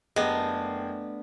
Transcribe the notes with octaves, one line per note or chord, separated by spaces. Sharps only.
F#1 A3 B3 D4 G4 G#4 A#4 D#5